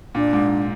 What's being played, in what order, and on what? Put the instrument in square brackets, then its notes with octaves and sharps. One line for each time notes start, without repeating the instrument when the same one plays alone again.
[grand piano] A#2 [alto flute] D4
[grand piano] G#2